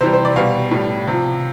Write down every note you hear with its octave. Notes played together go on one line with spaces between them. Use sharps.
C3 E3 G3 C5
C5
D5
B2 G3 F5
A2 G3
C3 F3